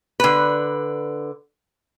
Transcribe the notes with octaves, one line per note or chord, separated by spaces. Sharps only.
D3 B4